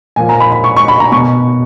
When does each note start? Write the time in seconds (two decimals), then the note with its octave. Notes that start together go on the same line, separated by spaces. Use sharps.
0.16 A#2 F3 G#5
0.29 A#5
0.40 B5
0.52 B5
0.64 C#6
0.76 C#6
0.88 B5
1.00 A#5
1.12 B2 C#6